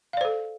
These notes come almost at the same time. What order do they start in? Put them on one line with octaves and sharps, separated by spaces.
F5 D5 C5 A4